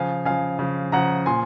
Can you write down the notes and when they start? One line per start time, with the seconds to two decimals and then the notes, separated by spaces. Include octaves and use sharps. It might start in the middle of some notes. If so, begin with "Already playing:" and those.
Already playing: C#3 F3 F5 G#5
0.25 C#3 F3 F5 G#5
0.59 C#3 F3
0.92 C#3 F3 F#5 A#5
1.26 A#2 F3 G#5 C6